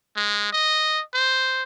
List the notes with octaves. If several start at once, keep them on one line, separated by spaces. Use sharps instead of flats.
G#3
D#5
C5